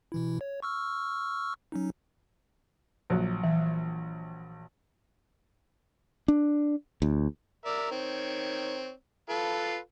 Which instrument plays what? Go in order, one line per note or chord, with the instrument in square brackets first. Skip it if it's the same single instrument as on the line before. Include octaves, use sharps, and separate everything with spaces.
[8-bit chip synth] B2 E3 E4
C#5
C#6 E6 F6
F#3 C#4 D#4
[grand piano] A#1 F#3
[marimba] E3
[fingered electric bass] D4
D2
[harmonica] A#4 D5 E5
D#3 C4 C#5
F4 A4 B4